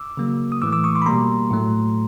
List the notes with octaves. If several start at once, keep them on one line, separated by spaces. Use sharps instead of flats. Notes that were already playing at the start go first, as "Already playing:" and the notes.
Already playing: D6 E6
C#3 F#3 A#3
D#6
A2 E3 A3 D6 E6
D6 E6
C#6 D#6
C6 D6
B5
B2 G3 A#3 A#5 C6
A2 F#3 A3